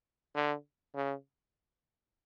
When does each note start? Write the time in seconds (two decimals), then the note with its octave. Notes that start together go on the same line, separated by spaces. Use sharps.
0.35 D3
0.95 C#3